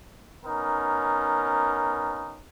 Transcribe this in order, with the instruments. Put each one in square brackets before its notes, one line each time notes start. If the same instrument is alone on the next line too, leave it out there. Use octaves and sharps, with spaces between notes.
[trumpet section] B3 C#4 D#4 A#4